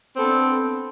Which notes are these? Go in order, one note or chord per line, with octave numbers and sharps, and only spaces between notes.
B3 C4 D4 A4